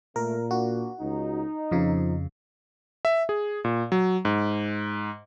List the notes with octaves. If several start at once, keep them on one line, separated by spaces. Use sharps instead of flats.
A#2 A3 A#4
A#3 D4 F#4
C#2 D#4
F2 C#3 F3 F4
E5
G#4
A#2
F#3
G#2